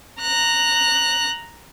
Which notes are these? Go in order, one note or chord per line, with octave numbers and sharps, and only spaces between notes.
A#5 F#6